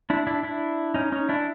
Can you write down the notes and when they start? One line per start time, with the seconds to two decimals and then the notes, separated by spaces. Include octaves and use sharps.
0.10 D4 E4
0.27 D4 E4
0.43 D4 E4
0.94 C#4 D#4
1.12 C#4 D#4
1.29 D4 E4